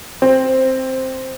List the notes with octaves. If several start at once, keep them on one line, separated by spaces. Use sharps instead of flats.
C4